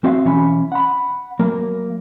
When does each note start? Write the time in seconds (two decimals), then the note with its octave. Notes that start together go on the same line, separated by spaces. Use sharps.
0.04 C4 F#4 E5 F5
0.24 B1 E3 C#4 C5 B5
0.72 F#5 B5
1.39 F#3 A#3 A#4 F5